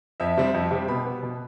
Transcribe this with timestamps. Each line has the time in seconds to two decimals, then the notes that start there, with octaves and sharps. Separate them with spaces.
0.20 F2 E5
0.37 C3 G3 C4
0.54 F2
0.71 C3 G3 C4
0.88 B2 B5
1.05 B3
1.23 B2